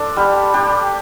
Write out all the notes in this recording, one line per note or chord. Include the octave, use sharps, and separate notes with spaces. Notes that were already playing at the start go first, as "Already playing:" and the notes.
Already playing: D4 A4 C5
G3 G4
D4 G4